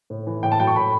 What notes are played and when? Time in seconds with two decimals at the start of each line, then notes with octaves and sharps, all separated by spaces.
0.10 A2
0.27 E3
0.43 A2 G5
0.52 A5
0.60 F#3 G5
0.67 C#6
0.76 A2 B5